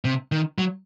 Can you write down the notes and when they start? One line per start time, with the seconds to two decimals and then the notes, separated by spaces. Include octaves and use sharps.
0.05 C3
0.32 D#3
0.58 F#3